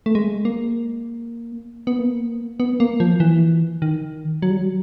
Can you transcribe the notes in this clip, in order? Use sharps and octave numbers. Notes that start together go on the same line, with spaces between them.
A3
G#3
A#3
B3
A#3
B3
A#3
F3
E3
D#3
F#3
G3
F#3